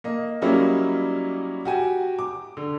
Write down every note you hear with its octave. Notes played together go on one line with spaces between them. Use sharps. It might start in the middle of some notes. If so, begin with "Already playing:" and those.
A#3 D#5
F#3 G3 A#3 C#4 D#4 E4
F#4 G4 G#5
D6
D3